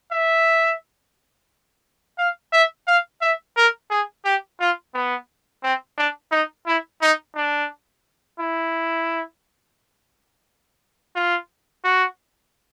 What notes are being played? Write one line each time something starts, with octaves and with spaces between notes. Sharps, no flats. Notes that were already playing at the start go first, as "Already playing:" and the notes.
E5
F5
E5
F5
E5
A#4
G#4
G4
F4
B3
C4
D4
D#4
E4
D#4
D4
E4
F4
F#4